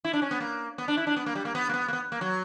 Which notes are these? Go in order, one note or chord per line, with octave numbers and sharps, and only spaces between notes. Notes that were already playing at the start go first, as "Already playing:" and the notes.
E4
D4
C#4
B3
A#3
B3
D4
E4
D4
B3
A#3
G3
A#3
B3
A#3
B3
A#3
B3
A#3
F#3